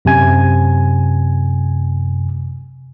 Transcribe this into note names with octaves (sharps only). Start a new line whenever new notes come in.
F#2 C3 G#5 G#6